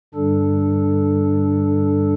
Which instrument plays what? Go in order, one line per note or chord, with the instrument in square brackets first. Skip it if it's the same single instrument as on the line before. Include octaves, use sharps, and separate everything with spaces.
[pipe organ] G2 D3 G3 D4 A4